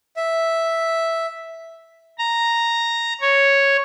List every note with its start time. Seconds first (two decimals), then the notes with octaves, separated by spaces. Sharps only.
0.17 E5
2.19 A#5
3.21 C#5